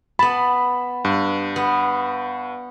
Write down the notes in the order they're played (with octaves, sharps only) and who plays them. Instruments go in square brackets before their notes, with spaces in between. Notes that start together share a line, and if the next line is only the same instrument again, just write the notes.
[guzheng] B3 A5 [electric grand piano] B5
[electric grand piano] G2
[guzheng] B3